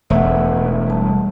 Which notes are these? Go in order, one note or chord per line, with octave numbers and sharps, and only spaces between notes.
E1 A3 E5 F#5
G3 A5